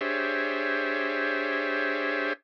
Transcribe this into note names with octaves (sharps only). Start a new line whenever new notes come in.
D4 G4 G#4 C5 C#5 E5